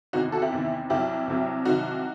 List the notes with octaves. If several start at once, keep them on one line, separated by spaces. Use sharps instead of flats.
E2 C3 D#3 D#4 F#4
F#4 A4
E4 G4
E2 C3 D#3
C2 C3 F#3 E4 G4
C2 C3 F#3
C2 C3 D#3 F#3 D#4 F#4